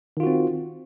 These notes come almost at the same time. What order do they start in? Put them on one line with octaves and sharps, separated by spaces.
D#3 F4 F#4 C4